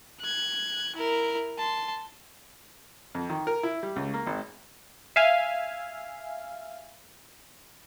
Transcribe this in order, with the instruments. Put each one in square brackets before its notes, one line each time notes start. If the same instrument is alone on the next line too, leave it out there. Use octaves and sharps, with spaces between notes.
[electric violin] F#6 G#6
E4 A#4
A5 C6
[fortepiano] F2
D#3
A#4
E4
G3
C#2
A#3
G#1
[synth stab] E5 F5 G#5